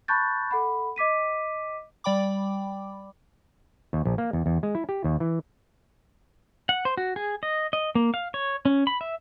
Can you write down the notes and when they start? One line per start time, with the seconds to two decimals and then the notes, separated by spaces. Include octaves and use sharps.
0.08 A5 B5 C#6 F#6 G6 A6
0.51 A4 F#5 B5
0.96 D#5 D6 B6 D#7
2.04 G3 D5 G5 B5 D6
3.93 D#2
4.05 A#1
4.18 A#3
4.33 E2
4.46 E2
4.63 G#3
4.75 E4
4.89 G4
5.04 D#2
5.20 E3
6.69 F#5
6.85 C5
6.97 F#4
7.16 G#4
7.43 D#5
7.73 D#5
7.95 A#3
8.14 F5
8.34 C#5
8.65 C#4
8.87 B5
9.01 E5